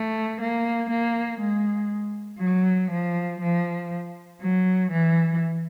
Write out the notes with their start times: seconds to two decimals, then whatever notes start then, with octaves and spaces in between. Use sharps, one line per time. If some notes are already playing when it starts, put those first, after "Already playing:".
Already playing: A3
0.41 A#3
0.90 A#3
1.40 G#3
2.40 F#3
2.91 F3
3.41 F3
4.41 F#3
4.91 E3